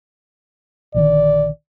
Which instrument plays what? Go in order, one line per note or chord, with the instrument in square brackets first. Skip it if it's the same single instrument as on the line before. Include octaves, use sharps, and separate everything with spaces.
[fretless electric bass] A#1 D3 D#3 [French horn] D5